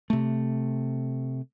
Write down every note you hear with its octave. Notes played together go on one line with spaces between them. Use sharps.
C3 A3